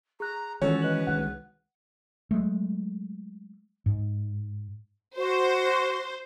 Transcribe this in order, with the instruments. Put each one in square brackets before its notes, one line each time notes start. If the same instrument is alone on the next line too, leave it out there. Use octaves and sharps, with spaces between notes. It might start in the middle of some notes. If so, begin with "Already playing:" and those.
[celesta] G#4 F#6 [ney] A#5
[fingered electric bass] D#3 E3 G#3 [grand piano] C#4 F#4 [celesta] F4 C#5 [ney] A4
[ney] B4 [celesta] D#5 F#7
[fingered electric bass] C2 D#3 G#3 [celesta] F#5
[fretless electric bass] F#3 G#3 A3
G#2
[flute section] F#4 [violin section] C5